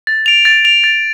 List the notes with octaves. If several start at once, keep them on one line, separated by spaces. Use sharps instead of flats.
A6
D7 F7
A6
D7 F7
A6